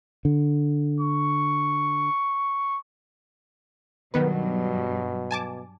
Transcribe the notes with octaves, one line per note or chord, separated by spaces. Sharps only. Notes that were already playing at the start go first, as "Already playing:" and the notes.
D3
C#6
G2 B2 D#3 F#3 G3 B3 B4
G#5 A5 D6